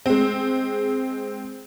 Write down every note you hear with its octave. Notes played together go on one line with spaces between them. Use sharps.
G#3 C4